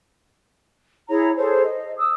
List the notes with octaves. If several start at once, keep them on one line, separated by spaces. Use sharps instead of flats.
E4 G#4 C#5 A#5
G#4 A4 C5 C#5
D#5
D#6 E6